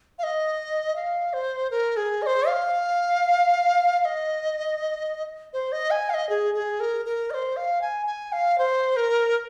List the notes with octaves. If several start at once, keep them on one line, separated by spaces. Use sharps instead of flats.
F5
D#5
F5
C5
A#4
G#4
D#5
C5
F5
F5
D#5
C5
D#5
G#5
F5
D#5
G#4
G#4
A#4
A#4
D#5
C5
F5
G#5
G#5
F5
C5
A#4